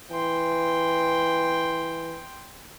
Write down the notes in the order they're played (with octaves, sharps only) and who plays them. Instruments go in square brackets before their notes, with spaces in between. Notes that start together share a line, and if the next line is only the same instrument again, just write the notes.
[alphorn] E3 [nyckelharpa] G5 C6